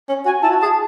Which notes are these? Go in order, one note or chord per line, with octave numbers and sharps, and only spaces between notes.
C#4
F#4 G#5
E4 A5
F#4
A5
G#4